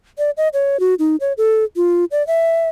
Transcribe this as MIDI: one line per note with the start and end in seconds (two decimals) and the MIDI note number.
0.18 0.31 74
0.37 0.48 75
0.54 0.80 73
0.80 0.95 66
0.99 1.16 63
1.21 1.33 73
1.38 1.64 69
1.76 2.05 65
2.11 2.25 74
2.27 2.69 76